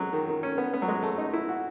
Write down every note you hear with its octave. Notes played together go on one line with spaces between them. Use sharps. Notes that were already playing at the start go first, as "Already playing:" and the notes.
Already playing: F#3 G#3
D#3
D#3
C#4
B3
B3
F#3
G#3
A3
D#4
E4
F#4